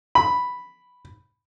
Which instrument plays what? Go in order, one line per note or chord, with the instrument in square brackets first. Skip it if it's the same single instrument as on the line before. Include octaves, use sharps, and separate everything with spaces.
[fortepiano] B5